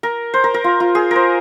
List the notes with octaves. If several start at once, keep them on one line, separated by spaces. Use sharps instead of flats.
A#4
C5
A#4
A#4
F4
F4
G#4
A#4 C5